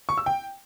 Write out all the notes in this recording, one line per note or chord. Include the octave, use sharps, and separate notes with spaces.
C#6
E6
G5